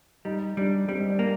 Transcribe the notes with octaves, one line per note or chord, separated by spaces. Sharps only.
G3 D#4 D#5
G3 D4 D5
G3 C4 C5
D#5
D4 D5
A#3